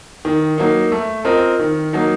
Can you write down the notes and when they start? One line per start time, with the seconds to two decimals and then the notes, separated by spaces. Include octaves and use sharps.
0.25 D#3
0.58 F#3 A#3 D#4
0.92 A3
1.25 C4 F4 A#4 D#5
1.59 D#3
1.93 F#3 A#3 D#4